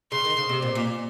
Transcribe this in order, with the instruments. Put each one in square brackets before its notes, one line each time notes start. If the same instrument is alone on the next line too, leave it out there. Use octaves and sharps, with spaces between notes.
[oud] C#3 [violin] C6
[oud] D#3
C#3
C3
A#2
A#2